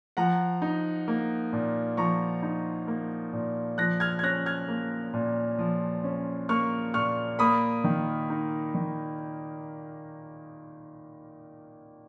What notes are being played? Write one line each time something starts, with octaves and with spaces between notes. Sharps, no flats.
F3 F#5 A#5
D#4
A#3
A#2
F3 A#5 C#6
D#4
A#3
A#2
F3 F#6 A#6
F6 G#6
G#6
C#4 F#6 A#6
F6 G#6
A#3
A#2
F3
C#4
A#3 C#6 F6
A#2 C#6 F6
A#3 B5 D#6
D#3
D#4
D#3